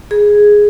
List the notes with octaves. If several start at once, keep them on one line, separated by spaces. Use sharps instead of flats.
G#4